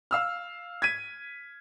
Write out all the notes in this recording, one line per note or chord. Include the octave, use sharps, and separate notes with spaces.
F5 E6 F6
G#6 B6 D#7